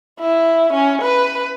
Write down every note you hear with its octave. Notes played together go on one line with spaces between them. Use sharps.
E4
C#4
B4